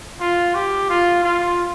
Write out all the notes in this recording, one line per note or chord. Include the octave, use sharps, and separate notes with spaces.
F4
G4
F4
F4